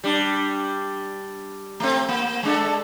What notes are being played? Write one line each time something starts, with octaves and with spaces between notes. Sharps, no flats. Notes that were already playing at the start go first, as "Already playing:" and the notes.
G3 D4
A3 C4
A#3
G#3 D4 A4